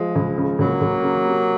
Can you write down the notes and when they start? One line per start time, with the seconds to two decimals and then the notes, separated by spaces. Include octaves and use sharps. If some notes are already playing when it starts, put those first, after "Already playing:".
Already playing: F3 G#3
0.16 C#2
0.38 C#3
0.59 C#2 F#3 A#3
0.81 C#2
1.03 C#3
1.25 C3